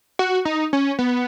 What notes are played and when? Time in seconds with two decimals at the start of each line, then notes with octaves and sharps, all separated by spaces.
0.19 F#4
0.45 D#4
0.73 C#4
0.99 B3